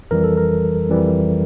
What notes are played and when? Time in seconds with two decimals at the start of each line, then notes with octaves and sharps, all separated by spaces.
0.11 F2 E3 G3 A#4
0.24 A4
0.37 A#4
0.89 F2 E3 G3